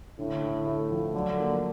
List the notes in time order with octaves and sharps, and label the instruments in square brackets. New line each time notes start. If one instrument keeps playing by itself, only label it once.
[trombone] A2 [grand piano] D3
[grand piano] D3
A3
F3
[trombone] D3 [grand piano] F#3
[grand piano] A#3